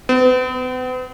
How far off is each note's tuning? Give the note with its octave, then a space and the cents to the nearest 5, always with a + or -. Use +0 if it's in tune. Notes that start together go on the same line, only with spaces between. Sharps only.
B3 +45